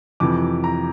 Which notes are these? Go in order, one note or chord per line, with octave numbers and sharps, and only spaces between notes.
F2 C3 E3 D6
A#5